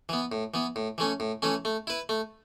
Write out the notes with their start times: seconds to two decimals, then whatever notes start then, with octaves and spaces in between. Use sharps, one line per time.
0.09 E3 B3
0.32 A2
0.54 E3 B3
0.76 A2
0.98 E3 A3 C#4
1.20 A2
1.42 E3 A3 C#4
1.65 A3
1.87 E4 B4
2.09 A3